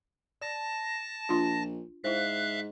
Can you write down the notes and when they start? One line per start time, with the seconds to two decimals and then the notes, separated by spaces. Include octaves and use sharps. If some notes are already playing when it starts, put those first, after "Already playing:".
0.41 D5 A5 A#6
1.29 A#1 D4 F4 C6
2.04 G#2 E4 C5 E5 F5 F#6